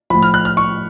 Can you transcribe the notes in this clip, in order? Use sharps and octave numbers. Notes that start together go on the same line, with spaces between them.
A2 F3 B5
F6
F#6
F6
C#6